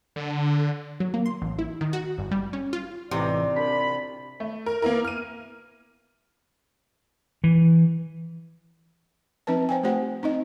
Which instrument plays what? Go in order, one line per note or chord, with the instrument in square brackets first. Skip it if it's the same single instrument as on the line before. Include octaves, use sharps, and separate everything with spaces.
[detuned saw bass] D3
[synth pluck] F#3
A#3
C6
A1
E4
D#3
F#4
G1
G3
C#4
F4
[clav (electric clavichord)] A1 E3 D#4 [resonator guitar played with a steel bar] C3 [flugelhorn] D5
[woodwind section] C2 F4 B5 [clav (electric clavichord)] D4
[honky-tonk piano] A3
A#4
A#3 B3 E4 A#4
F6 D#7
[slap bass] E3
[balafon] F3 C4 D#4 B4 A5
C5 G5 G#5
A3 F4 G4 C5 F#5 G5
C4 D#4 D#5